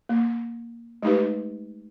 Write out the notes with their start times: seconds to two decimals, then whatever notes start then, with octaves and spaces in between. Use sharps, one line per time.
0.09 A#3
1.03 G#3 A3 D#4 G4 B4